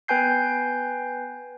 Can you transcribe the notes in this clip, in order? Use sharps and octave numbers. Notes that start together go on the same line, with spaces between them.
B3 B4 G5 G#5 G6 C7